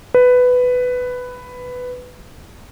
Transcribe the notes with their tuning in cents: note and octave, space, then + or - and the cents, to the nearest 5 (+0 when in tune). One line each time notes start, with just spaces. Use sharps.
B4 +10